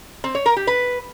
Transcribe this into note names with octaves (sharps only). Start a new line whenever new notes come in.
C4
C#5
A#4
G4
B4